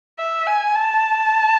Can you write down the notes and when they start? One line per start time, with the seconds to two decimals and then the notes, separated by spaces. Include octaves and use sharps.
0.19 E5
0.47 G#5
0.75 A5